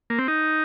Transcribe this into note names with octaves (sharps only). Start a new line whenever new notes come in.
A#3
C4
D#4